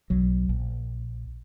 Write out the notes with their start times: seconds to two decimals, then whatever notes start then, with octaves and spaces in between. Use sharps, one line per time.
0.10 B1 F#3
0.49 A#1